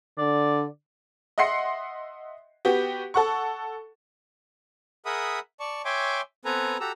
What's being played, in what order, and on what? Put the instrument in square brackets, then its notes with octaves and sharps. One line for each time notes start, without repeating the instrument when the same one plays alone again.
[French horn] D3 [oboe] D5
[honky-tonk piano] D#5 E5 F#5 C6 C7 C#7
B3 F#4 G4
A4 F#5 C#6
[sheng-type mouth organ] G#4 A#4 E5 F#5 B5 D#6
D5 A5 C#6
C#5 E5 G5 G#5 C6 D6
B3 C4 A4 B4 G#5 A#5
F#4 G4 A4 A#5 E6